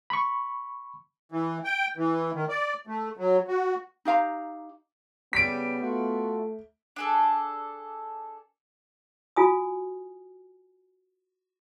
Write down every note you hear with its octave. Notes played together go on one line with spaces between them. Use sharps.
B5 C#6
E3
G5
E3
D#3
D5
A3
F#3
F#4
D#4 G4 F5 A#5
C#3 G3 B3 B6 D7
A3 F4 F#4
D4 G#4 A4
F4 F#4 G#5 D#6